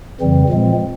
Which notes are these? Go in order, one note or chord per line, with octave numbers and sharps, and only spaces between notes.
F2 C#3 E3 G3 C4
A#2 F3 G#3 C4